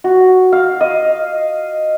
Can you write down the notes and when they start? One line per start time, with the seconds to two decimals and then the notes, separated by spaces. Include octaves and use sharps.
0.04 F#4
0.53 F5
0.81 D#5